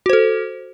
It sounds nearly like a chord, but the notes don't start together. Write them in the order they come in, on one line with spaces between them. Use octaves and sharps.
F#4 C5 A4